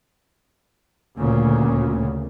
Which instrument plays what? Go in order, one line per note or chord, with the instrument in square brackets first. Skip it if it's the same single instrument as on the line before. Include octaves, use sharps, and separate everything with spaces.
[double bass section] D2 A#2 C#3